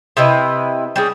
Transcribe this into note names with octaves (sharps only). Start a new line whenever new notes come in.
C3 E4 B4 D#5
G3 C#4 G#4